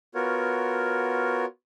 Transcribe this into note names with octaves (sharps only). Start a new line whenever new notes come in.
B3 F4 F#4 A#4 C#5